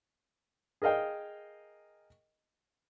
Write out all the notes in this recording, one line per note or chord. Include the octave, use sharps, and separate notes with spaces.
G#4 A#4 D#5 F5 G5